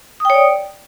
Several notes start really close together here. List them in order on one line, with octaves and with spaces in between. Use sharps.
D#6 G5 C#5 D5